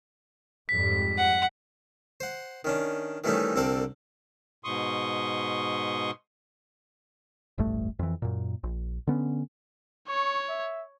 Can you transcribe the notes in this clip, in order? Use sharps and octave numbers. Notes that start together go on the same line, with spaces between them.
F2 G#2 G3 B6
F#5
C5 F#5
D#3 C#4 D4
D#3 E3 G3 A3 C#4 D#4
C2 D3 C4 A4 A#4 D5
G#2 B2 C6 C#6 D#6
E1 A1 G2 A3
F2 E3
F#2 A#2
A#1
D3 B3 C#4
C#5 C#6
E5